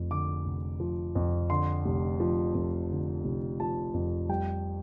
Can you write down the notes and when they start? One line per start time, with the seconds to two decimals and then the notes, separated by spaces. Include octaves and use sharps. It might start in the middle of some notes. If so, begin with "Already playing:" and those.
Already playing: F1 F2 F3
0.11 D3 D6
0.46 F1
0.80 F3
1.15 F2
1.50 D3 C6
1.85 F1
2.20 F3
2.54 F2
2.90 D3
3.25 F1
3.60 F3 A5
3.94 F2
4.29 G3 G5